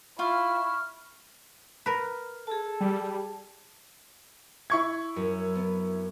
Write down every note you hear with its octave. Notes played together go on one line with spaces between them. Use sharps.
E4 F4 C#6 F6
A#4 B4
G#4 A4 A5
G3
E4 C#6 G#6
F#2
B3